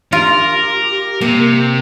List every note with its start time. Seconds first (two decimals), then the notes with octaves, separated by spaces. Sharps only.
0.12 F4 G4 A#4
1.21 C3 A#3